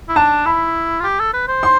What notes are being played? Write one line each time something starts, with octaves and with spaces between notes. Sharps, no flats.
E4
D4 A5
E4 B5
F4
G4
A4
B4
C5
C6